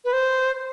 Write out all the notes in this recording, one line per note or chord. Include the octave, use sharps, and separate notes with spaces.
B4
C5